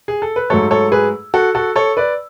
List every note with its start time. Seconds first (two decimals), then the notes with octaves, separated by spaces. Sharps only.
0.08 G#4
0.22 A4
0.36 B4
0.50 G#2 F#3 A3 A4 C#5
0.71 A4 C#5
0.92 G#4 B4
1.34 F#4 A4
1.55 F#4 A4
1.76 A4 C#5
1.97 B4 D5